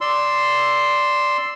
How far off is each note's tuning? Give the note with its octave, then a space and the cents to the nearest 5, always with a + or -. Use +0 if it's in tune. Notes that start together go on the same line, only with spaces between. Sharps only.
D5 +0 C6 +0 E6 +0